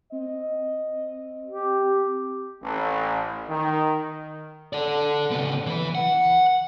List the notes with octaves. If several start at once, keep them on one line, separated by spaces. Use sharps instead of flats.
C4 D#5
G4
A1
D#3
A4 D5
C#3 B3
E3 B4
F#5